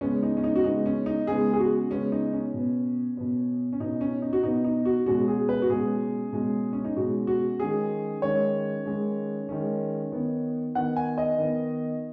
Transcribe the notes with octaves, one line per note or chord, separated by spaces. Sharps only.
C#3 G#3 B3 C#4
D#4
C#4
D#4
F#4
C#3 G#3 B3 D#4
C#4
D#4
C#3 G#3 B3 G#4
G#4
F#4
C#3 G#3 B3 C#4
D#4
C#4
B2 B3
B2 B3
C#4
B2 B3 D#4
C#4
D#4
F#4
B2 B3 D#4
D#4
F#4
B2 G#3 C#4 F#4
G#4
B4
F#4
B2 G#3 C#4 G#4
B2 G#3 C#4
C#4
D#4
B2 G#3 C#4 F#4
F#4
D#3 G#3 C#4 G#4
D#3 G#3 C#4 C#5
D#3 G#3 C#4
D#3 G#3 C#4
D#3 B3
D#3 B3 F#5
G#5
D#5
D#3 B3